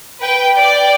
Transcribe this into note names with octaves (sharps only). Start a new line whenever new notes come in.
B4 G5
D5 G5